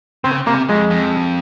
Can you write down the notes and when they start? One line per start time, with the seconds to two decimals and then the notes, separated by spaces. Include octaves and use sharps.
0.24 C#3 C4
0.47 C3 A#3
0.69 F2 G#3
0.90 F2